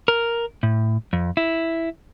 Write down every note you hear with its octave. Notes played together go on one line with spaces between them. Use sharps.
A#4
A2
F2
E4